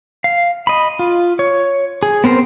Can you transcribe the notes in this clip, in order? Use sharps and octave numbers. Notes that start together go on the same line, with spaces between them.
F5
D#5 B5
F4
C#5
G#4
B3 C4 A#4 C5